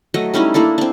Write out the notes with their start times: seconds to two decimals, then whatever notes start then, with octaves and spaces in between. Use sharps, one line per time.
0.14 F#3 A3 D#5
0.34 G3 C#4 D#4 E4
0.54 A#3 D4 E4 A4
0.78 C4 D4